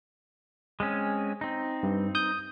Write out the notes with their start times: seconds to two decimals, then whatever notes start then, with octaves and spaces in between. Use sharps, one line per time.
0.80 G#3 C4 C#4
1.41 C4 D#4
1.83 G2
2.15 D#6 G6